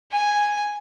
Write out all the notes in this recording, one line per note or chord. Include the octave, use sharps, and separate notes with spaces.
G#5